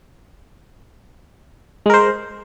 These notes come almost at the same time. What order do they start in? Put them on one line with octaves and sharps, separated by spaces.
G#3 A#4 C5